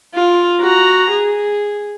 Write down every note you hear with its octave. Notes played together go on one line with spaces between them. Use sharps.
F4
F#4 A#5
G#4